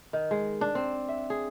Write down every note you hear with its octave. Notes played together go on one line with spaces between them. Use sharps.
D#3
G#3
D4
C4
E5
G#4